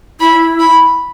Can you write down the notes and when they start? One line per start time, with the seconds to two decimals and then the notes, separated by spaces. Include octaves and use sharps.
0.20 E4 B5
0.60 B5